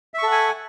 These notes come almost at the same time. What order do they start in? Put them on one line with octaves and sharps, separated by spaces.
E5 C#6 A4 F#5 G#5